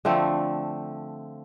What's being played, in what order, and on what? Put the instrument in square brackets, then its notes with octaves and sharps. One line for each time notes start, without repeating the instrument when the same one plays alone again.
[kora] D3 F3 A3 C4